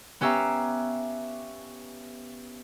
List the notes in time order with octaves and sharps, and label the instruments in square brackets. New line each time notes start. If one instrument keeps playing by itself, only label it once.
[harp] B3 C#4 G4 E5 F5 A#5